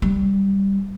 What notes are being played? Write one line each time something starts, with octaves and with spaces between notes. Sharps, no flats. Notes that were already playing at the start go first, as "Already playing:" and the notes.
G3